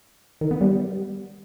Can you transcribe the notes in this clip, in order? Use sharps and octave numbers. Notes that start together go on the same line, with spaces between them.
D#3
B3
G3